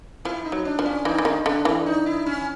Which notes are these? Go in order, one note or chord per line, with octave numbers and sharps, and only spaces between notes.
F3 E4
D#4
F#3
D4
F3
C#4
E3 D#4
E3
D#3
D3 D4
E3
D#4
E4
C#4